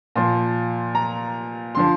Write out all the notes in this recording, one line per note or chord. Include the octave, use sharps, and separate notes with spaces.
A#2 F3 C6
A#5
D3 F3 C6